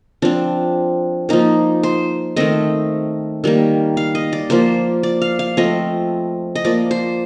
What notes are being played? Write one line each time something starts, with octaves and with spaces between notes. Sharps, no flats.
F3 C4 D4
F3 A#3 D#4
C5
D#3 A3 C4 D#5
D#3 G3 A#3
F5
D#5
D5
F3 A#3 C5
D5
F5
F5
F3 A3 C4 D#5
D#5
F3 A#3 D5
C5